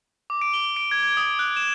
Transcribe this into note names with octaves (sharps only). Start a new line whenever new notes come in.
D6
D7
G7
D7
G#6
G#6
D#6
F#6
E7